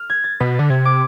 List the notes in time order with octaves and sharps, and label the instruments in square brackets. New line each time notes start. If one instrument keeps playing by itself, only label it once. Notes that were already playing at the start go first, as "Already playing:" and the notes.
Already playing: [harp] F6
G#6
A6
[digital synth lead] B2 [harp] B6
[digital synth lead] D3 [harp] A6
[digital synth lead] C3 [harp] G#6
[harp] D6